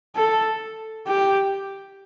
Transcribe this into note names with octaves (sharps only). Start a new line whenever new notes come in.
A4
G4